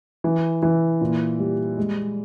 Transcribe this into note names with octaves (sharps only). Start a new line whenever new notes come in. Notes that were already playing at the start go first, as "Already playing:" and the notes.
E3
E3
A#2
G3
G#3